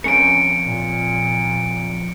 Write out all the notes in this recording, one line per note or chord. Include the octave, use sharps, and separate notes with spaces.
F3 C4 C#4 A#4 C#7 D7
A#2